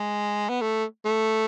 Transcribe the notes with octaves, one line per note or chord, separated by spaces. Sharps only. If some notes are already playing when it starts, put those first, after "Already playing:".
Already playing: G#3
B3
A3
A3